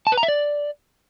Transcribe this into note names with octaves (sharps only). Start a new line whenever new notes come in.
A5
B4
A#5
E5
D5